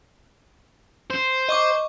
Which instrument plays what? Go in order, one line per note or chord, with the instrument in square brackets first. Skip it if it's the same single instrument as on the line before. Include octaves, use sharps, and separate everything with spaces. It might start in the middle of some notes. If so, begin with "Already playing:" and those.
[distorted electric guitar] C5
[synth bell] D#5 C#6 D6